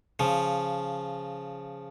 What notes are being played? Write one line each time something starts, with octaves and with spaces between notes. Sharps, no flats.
C#3 F3